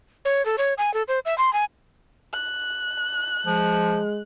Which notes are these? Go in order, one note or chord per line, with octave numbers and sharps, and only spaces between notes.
C#5
A4
C#5
G#5
A4
C5
E5
C6
G#5
F#6
F3 G#3